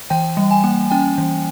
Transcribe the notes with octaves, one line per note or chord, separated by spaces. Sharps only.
E3 G5
G3
G#5
A#3
C#4 G5
E3